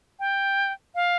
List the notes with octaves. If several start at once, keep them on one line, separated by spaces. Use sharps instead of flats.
G5
F5